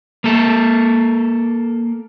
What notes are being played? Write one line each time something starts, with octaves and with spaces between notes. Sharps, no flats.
A#3 A4